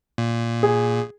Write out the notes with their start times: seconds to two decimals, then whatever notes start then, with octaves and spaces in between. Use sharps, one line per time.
0.18 A#2
0.63 G#4